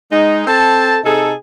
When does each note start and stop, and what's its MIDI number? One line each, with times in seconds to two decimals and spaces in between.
0.12 0.44 56
0.12 0.44 63
0.47 0.99 60
0.47 0.99 69
0.47 0.99 81
1.04 1.33 48
1.04 1.33 63
1.04 1.33 68
1.04 1.33 69